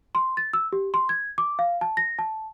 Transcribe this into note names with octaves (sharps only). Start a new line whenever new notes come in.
C6
A6
E6
G4
C6
G#6
D6
F5
A5
A#6
A5